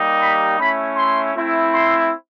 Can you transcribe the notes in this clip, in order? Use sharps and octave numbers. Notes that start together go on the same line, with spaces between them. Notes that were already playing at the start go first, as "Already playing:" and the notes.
Already playing: G3 A#3 D#4 G4
B5
A3 C#4 E4 B5
C6
A3 C4 E4
C6